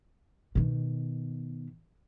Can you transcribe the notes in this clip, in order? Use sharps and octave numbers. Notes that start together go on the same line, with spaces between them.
B2 D#3